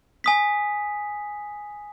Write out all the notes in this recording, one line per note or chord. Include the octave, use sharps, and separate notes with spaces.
G#5 D#6 B6